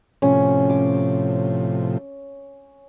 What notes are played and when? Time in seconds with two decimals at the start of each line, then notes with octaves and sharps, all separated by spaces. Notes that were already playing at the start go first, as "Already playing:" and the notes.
0.22 A2 C3 F3 C#4
0.70 D6